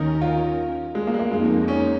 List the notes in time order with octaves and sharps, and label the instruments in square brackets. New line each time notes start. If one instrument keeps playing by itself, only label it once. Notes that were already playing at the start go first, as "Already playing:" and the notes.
Already playing: [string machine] D#2 D#3 C#4 A#4 [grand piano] D#4
[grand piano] F4
G#3
A#3
G#3
A#3
[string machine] F2 F3 A#3 D#4 [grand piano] G#3
[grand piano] C#4